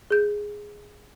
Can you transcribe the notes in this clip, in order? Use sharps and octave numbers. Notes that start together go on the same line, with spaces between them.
G#4 G6